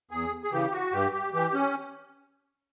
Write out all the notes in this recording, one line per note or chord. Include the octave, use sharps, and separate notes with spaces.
E2 G#4
G#4
C#3 E3 G4
F#4
G2 G4
G4
E3 G4
C#4